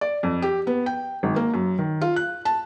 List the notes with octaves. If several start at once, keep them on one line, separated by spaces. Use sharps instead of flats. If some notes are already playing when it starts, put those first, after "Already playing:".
D5
F2
G4
B3
G5
G#1
A#3
F#2
D#3
F4
F#6
A5